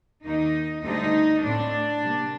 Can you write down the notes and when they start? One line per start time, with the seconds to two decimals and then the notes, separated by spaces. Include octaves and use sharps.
0.23 D#2 D#3 A#3 D#4
0.83 D2 D3 G3 D#4
1.43 A2 A3 C4 D4
2.03 C3 G3 A#3